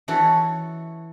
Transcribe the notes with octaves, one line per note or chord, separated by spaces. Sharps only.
E3 F#4 A4 C#5